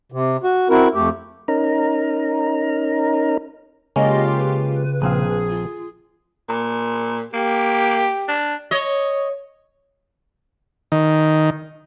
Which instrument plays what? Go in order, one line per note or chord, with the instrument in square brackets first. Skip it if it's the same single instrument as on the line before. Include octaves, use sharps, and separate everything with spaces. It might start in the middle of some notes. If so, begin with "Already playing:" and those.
[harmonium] C3
F#4
C4 E4 F#4 A#4
F2 A3 G4
[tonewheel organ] C#4 D#4 A#4 A#5
[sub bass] C#3 [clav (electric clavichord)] G#3 A#3 C#4 [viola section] F4 G4 [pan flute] D#5
[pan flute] B4
[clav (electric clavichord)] A#1 C4 F5 [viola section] G#4
[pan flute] F4
[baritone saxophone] A#2
[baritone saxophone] A#3 [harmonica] G4
[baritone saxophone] D4
[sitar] C#5 D#5
[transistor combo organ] D#3